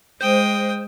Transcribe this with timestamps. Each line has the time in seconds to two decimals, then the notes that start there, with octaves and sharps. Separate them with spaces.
0.21 G#3 C5 G5 D#6